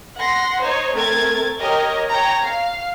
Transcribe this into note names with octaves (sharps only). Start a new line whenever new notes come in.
F#5 C6 A#6
D#4 C5 C#5
A3 C4 A#4 G#6 A6
G4 A#4 C#5 D#5
C#5 G5 A#5
F5